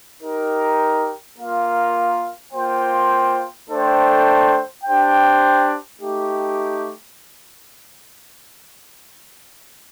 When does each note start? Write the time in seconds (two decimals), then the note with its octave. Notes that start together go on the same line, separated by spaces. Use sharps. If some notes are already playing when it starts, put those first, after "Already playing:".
0.21 D#4 G4 A#4
1.37 A#3 F4 A#4 F5
2.53 A#3 F4 C5 G5
3.68 A3 D4 A4 C5 G5
4.84 D4 G4 C5 G5
5.99 A3 D#4 G4